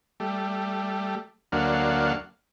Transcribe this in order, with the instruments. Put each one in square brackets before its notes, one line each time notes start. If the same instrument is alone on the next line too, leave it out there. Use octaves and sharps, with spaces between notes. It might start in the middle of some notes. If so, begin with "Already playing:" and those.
[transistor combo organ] G3 A3
D2 F#3 A#3 D4 F5 F#5